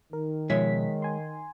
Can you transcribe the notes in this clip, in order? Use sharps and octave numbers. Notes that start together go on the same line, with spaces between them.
D#3 A#4
B2 F3 G#3 C#5 E5 B6
G#5 C6